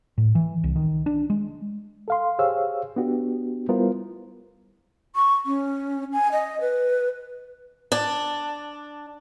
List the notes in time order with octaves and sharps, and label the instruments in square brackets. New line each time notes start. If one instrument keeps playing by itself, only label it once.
[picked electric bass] A2
E3
C2
D#3
D4
G#3
[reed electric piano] A4 F5 C6
G4 G#4 C5 C#5 F5 E6
B3 D4 F#4 G4
G3 B3 E4 F4 A#4 C5
[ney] C#6
C#4
G#5
D#5
B4
[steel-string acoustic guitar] D4